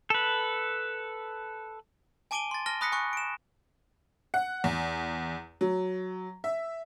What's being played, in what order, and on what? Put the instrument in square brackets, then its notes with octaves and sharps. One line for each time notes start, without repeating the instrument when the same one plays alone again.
[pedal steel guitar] A4 B4
[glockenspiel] G#5 A5 D6 D7 D#7 G7
C6 A6
A5 F6 A#6 G7
B5 D#6 F#6 A#6 B6 C#7
G#5 C#6 F#6
D7 E7
[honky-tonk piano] F#5
E2
F#3
E5